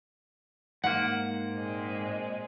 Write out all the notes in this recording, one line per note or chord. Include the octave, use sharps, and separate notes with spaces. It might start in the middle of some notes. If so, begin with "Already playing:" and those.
G#2 A#3 F#5
A#2 G#3 C4